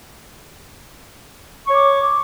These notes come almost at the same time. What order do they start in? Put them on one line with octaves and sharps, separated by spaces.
C#6 C#5 D6